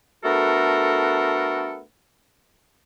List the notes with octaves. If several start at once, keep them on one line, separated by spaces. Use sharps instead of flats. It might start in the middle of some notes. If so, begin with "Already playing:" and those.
A3 B3 D4 F#4 A4 A#4